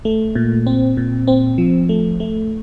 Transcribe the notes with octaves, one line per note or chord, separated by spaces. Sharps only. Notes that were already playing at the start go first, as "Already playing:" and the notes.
A3
A#2
C4
A#2
C4
F3
A3
A3